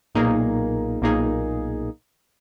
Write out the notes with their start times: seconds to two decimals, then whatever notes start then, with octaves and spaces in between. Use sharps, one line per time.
0.15 B1 A#2 A#3 D#4 G#4
1.02 B1 A#2 A#3 D#4 G#4